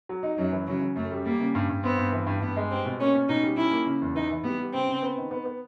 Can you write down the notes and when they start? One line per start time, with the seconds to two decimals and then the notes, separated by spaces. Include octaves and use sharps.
0.09 F#3
0.23 D#4
0.37 F#2 F#3
0.52 E3
0.67 C#3 F#3
0.81 C#3
0.96 F#2 A3
1.11 G3
1.25 G3 A#3
1.40 C#3
1.55 G2
1.69 G2
1.84 B3 C4
1.98 G2
2.12 E3
2.27 G2
2.41 G2 B3
2.56 G#3
2.70 G3 C4
2.85 B2
3.00 A#3 C#4
3.14 C#4
3.29 B2 D#4
3.43 G3
3.57 C#4 E4
3.71 A#3
3.86 C#3
4.01 E2
4.15 E3 D#4
4.30 E3
4.44 G3 B3
4.58 G3
4.73 C#3 C4
4.88 C#3
5.02 B3
5.18 D#3
5.31 B3
5.45 B3